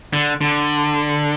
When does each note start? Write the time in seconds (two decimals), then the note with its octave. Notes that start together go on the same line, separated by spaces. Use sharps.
0.13 D3
0.41 D3